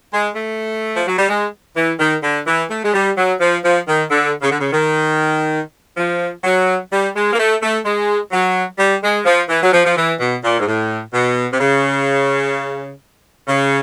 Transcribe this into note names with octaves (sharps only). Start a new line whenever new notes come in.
G#3
A3
F3
F#3
G3
G#3
E3
D#3
D3
E3
A3
G#3
G3
F#3
F3
F3
D#3
D3
C#3
D3
C#3
D#3
F3
F#3
G3
G#3
A#3
A3
A3
G#3
F#3
G3
G#3
F3
E3
F#3
F3
F3
E3
B2
A#2
G#2
A2
B2
C3
C#3
C#3